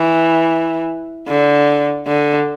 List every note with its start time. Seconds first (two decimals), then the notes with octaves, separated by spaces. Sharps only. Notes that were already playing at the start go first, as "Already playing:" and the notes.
Already playing: E3
1.27 D3
2.08 D3